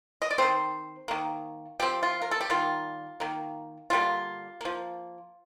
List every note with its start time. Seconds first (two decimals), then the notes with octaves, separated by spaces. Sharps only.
0.22 D#5
0.31 D5
0.38 D#3 A3 C4 C5
1.08 D#3 A#3
1.80 F3 C4 G4
2.03 F4
2.22 A#4
2.31 A4
2.41 G4
2.50 D#3 G3 A#3 F4
3.20 D#3 A#3
3.90 D3 G3 A#3 F4
4.61 F3 A#3